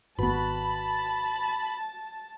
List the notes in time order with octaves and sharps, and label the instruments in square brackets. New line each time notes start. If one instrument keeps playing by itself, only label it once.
[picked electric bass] G#1 B3 [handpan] F#4 B4 [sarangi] A5 [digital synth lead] B5